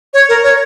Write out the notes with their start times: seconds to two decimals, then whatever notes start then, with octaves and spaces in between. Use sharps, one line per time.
0.14 C#5
0.29 A#4
0.44 C#5